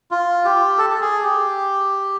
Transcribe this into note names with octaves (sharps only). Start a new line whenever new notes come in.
F4
G4
A4
A4
G#4
G4